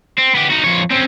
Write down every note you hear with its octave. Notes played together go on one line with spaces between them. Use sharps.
C4
B3 G4
D#4 F#4
F2 C#5
C4 C#4